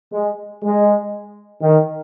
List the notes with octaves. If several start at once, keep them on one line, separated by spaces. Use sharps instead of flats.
G#3
G#3
D#3